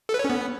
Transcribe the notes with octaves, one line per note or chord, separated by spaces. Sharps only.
A4
B4
C#5
C#4
B3